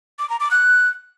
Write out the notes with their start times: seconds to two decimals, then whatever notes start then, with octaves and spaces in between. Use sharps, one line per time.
0.19 D6
0.29 A#5
0.40 D6
0.51 F#6